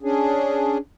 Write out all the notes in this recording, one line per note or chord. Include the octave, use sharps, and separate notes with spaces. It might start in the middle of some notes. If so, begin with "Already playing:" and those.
C#4 D4 G#4